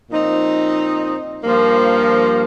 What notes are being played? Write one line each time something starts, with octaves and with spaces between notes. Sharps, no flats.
A#2 F3 C4 D#4
G2 F3 A#3